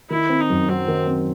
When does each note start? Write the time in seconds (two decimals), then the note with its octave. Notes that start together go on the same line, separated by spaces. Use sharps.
0.10 D#3 E4
0.30 C4
0.40 D#4
0.50 F#2
0.69 F#3 C4
0.88 D#3
1.07 C4